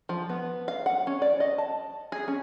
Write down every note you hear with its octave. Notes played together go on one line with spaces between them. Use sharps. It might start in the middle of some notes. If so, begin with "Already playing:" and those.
F3
B3
F5
F#5
C#4
D5
D#5
A5
G#4
C#4